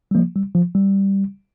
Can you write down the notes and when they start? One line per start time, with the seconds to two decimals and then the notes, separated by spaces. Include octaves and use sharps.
0.11 G3
0.15 F3 A#3
0.36 G3
0.55 F3
0.75 G3